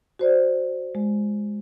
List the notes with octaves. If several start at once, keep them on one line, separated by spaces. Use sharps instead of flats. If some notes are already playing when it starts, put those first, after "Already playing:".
F#4 C5 D5
G#3